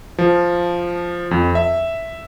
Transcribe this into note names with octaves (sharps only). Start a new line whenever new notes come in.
F3
F2
E5